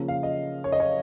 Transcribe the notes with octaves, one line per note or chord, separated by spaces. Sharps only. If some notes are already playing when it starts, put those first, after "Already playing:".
Already playing: C#3 F3 A#3
F5
D#5
C#5
D#5
C#5